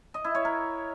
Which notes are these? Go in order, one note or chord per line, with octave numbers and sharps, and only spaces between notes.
D#5
E4
C#5
A#4